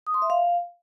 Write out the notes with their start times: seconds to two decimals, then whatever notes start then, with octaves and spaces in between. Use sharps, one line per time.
0.07 D#6
0.14 C6
0.22 E5
0.30 F5